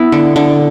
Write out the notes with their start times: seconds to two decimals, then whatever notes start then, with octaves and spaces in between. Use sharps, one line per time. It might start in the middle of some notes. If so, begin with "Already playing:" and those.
Already playing: B3 E4
0.12 D3
0.36 D3